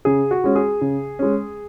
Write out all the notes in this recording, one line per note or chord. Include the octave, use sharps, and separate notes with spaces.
C#3 G#4
F#4
G#3 C#4
G#4
C#3
G#3 C#4